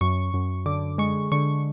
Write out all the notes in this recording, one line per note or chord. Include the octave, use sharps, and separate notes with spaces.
F#2 C#6
F#2
D3 D6
G#3 C#6
D3 C#6